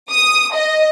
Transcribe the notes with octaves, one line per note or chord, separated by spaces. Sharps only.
D#6
D#5